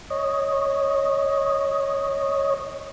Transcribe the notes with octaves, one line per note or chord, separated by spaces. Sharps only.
C#5 D#5